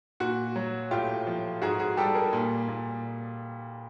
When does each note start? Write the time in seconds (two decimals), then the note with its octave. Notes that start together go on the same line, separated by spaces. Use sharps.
0.20 A#2 F#4
0.56 F#3
0.91 A2 F4 G4
1.27 F3
1.62 G#2 F#4 G#4
1.79 F#4 G#4
1.97 G3 G4 A4
2.15 G#4 A#4
2.33 A#2
2.68 A#2